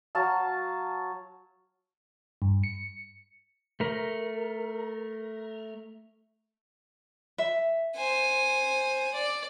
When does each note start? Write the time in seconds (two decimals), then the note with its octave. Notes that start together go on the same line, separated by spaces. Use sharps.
0.15 F#3 F5 A5
2.42 G2
2.63 C#7
3.80 A3 A#4
7.38 E5
7.96 C5 G#5
9.14 D5